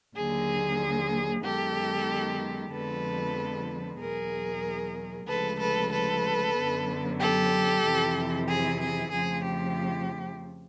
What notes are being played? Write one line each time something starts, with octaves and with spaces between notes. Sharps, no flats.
D#2 D3 F#3 A#3 G#4
F#2 D#3 G#3 B3 G4 A4
F2 D3 F3 G#3 B3 A4 B4
E2 B2 F#3 G#4 A#4
D2 C#3 F3 G#3 A4 B4
A4 B4
A4 B4
F#2 D3 F#3 B3
G4 A4
F2 C3 E3
G#4
G#4
F2 C#3 F3 A3 G#4
G4